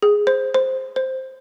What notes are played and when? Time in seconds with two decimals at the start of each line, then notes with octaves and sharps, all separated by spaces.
0.02 G#4
0.27 C5
0.54 C5
0.96 C5